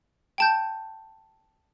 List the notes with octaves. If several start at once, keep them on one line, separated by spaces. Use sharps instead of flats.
G5 A5 G6